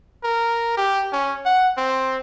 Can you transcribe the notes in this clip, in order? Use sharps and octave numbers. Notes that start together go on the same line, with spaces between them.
A#4
G4
C#4
F#5
C4